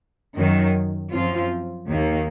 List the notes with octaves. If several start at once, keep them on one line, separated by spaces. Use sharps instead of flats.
F#2 D#3 F#3
F#2 F3 C4 F4
D#2 D#3 A#3